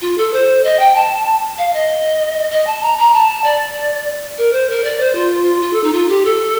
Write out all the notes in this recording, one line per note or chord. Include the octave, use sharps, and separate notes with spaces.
F4
A4
C5
D#5
G5
A5
F5
D#5
D#5
A5
A#5
A#5
A5
D5
A#4
C5
A#4
D5
C5
F4
F4
A4
D#4
F4
G4
A4